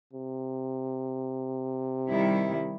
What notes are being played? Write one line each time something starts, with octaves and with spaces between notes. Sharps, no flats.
C3
D#3 G3 E4